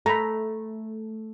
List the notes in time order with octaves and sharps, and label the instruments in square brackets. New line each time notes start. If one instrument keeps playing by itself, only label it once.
[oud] A3 [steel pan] A#5 B5